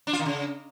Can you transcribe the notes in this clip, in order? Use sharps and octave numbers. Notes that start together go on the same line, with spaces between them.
D4
F4
D#3
C#3